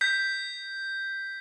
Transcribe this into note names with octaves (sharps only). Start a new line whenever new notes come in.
G6 B6